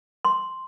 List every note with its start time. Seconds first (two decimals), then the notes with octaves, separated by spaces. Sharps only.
0.25 C6